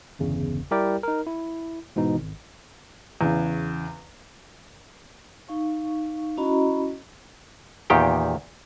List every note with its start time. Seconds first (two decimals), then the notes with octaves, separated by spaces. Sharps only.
0.19 G1 E2 C#3
0.71 G3 E4 G4 A#4 D5 G5
1.03 D#4 A#4
1.27 E4
1.96 G#2 B2 E3 D#4
2.16 G#1
3.21 E2 C#3
5.49 D#4 F5 C#6
6.38 C#4 E4 F#4 D#5 A#5 B5
7.90 E2 A#2 D#3 G4 G5